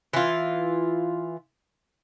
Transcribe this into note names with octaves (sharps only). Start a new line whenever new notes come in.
E3 F4